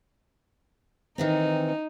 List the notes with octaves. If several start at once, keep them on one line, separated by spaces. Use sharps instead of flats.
D#3 E3 C4 D#4